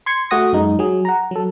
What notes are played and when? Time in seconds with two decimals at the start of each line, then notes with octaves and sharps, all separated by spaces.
0.06 C6 G#6 C#7
0.31 A3 F#4 F#5 D#6 A#6
0.53 F#2 G#3 D#4
0.79 F#3 G#4
1.05 F#5 A#5
1.31 F#3 A4